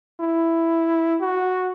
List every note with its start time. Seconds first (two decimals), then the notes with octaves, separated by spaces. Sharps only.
0.20 E4
1.21 F#4